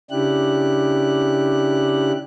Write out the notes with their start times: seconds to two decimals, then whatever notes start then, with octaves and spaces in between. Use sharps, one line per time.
0.11 C#3 D4 E4 G4 F#6